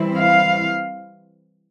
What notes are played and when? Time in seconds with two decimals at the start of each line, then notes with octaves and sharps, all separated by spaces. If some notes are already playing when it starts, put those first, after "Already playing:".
Already playing: E3 G3 C4 E4
0.17 F5